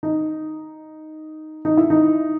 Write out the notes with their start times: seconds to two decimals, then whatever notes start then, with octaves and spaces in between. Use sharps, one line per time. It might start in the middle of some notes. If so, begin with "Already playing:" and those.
0.03 D#4
1.65 D#4
1.77 E4
1.90 D#4